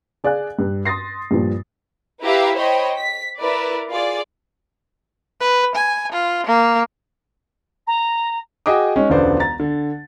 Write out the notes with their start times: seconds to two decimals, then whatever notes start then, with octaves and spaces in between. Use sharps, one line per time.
0.24 G#4 D5 F5 G#5 F#6
0.59 G2
0.85 C6 D#6 A6 A#6 C7
1.31 G2 A#2 F3
2.22 E4 G4 B4 E5 F5 A#5
2.56 C5 C#5 D#5 G5 B5
2.98 B6
3.38 E4 A#4 B4 D5
3.90 F4 G#4 D5
5.40 B4
5.75 G#5
6.13 F4
6.47 A#3
7.87 A#5
8.66 F#4 G#4 D#5 G5 D6 D#6
8.96 G#3 C#4 D#4
9.10 E1 C#2 D3 B3 C5 D5
9.40 A#5 A6
9.60 D3